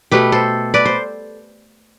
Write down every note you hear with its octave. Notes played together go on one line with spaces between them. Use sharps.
B2 A3 G4 B4
A4 C5
B4 D5
C5